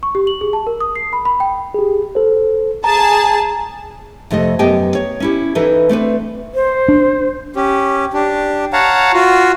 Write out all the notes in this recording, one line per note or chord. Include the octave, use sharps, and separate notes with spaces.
C#6
G4
F#7
G#4
A5
A#4
D#6
C7
B5
B5
G5
G4 G#4
A4 C5
G#4 A5 A#5
F2 C3 A3 D#5
F#2 B3 G4 D#5 G5 G#5
C#5
C#4 E4 G4
E3 D#4 A4 B4 E5
A3 C4 D4 B4
C5
D4
C#4 G4
D4 G4
C#5 F5 F#5 A5 A#5
F4 F#4